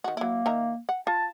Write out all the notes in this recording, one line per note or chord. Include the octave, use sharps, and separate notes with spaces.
D#3 F#4
F#3 A#3 E4
D#3 E5 A#5
F#5
F4 A5